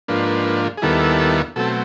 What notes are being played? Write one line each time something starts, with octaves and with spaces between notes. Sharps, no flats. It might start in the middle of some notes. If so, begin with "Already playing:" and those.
G#2 F3 A#3 D4 B4
G#4
D#2 D#3 G3 B3 E4 A4
B2 F#3 A3 C4 A4